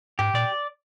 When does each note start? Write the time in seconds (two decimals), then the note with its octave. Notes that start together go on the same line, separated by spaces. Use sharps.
0.19 G#2 G4
0.34 A#2 D5